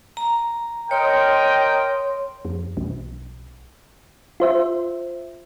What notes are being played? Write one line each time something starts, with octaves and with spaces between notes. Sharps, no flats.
A#5
A#4 C#5 D#5 G5 C6
F2
B1
F4 C5 E5